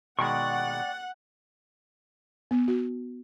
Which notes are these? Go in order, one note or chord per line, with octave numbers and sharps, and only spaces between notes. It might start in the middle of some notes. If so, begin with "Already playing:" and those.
B2 D#3 G#3 D5 F#5 G5 C#6
B3
F#4